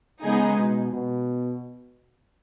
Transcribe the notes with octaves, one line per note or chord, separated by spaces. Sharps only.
C#3 G#3 B3 D#4 G#4
B2
B2